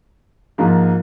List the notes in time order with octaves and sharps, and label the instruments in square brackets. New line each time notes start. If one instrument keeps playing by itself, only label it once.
[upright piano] G#2 F3 A#3 F4